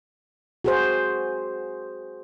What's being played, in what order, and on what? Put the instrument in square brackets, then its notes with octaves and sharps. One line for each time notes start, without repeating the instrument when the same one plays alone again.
[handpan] F#4 G#4 C5